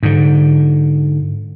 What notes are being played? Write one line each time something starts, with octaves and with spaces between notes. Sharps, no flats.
G#2 D3